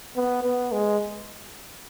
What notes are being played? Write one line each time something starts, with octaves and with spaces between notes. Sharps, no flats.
B3
B3
G#3